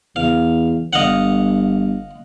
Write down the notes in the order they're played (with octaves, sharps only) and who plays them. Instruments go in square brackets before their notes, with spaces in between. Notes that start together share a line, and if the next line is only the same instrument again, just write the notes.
[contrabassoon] E2 [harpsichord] F5
[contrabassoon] G1 [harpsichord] D#5 F5 F#5